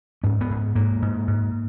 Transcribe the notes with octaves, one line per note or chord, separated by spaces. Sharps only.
G#2 C#4
B3
G#2
G#2 A#3
G#2
G#2